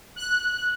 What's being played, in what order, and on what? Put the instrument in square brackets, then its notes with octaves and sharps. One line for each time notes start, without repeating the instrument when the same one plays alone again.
[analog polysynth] F#6